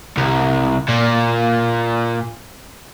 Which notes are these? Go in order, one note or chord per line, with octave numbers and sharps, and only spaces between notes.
C2
A#2